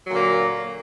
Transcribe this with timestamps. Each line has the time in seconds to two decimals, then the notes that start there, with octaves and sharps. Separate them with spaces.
0.07 F#3
0.09 A#2
0.12 D3
0.14 A#3